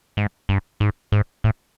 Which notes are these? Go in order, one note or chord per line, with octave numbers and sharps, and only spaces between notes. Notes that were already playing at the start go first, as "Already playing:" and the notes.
G#2
G2
G#2
G#2
A2